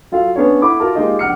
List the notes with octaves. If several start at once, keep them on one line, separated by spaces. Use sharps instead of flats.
F#3 F4 A4 F5
B3 C#4 D4 C#5
E4 A4 E5 F#5 B5 D6
F4 F#4 A#4 A5
G#3 A#3 D#4 F4 G4 D#5
A#1 F#5 F6 C#7